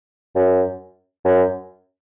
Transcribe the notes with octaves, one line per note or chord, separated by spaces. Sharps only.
F#2
F#2